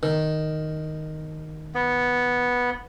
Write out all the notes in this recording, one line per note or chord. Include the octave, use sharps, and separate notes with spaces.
D#3
B3